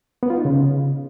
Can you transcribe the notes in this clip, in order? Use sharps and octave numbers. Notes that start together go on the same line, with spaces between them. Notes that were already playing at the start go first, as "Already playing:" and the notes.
B3
F4
D#4
C#3